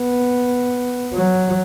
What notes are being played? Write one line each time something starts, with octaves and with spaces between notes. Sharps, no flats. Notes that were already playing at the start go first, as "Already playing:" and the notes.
Already playing: B3
F#3